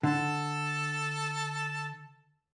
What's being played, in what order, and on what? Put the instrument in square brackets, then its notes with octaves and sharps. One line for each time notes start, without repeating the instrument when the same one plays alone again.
[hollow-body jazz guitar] D3 [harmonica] A4 A5